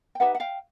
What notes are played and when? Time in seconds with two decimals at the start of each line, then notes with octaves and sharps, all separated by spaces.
0.15 G5
0.20 D#4 G4 B4 E5 F#5
0.35 F#5
0.40 F5 G5